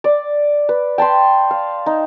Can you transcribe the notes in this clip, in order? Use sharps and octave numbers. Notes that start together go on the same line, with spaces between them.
D5
B4
G5 A5 B5 C6
F5
D#4